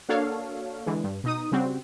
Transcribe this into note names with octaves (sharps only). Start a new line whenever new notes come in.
A#3 D4 F#4 A4 C#5 F5
D3 E3 G#3
G2
B2 D#4 D#6
C#3 G3 C4 F#4